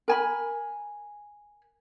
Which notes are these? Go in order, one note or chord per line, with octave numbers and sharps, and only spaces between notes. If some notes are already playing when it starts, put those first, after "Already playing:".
A#4 G#5 B5